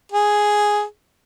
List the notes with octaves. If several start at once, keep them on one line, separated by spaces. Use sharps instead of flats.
G#4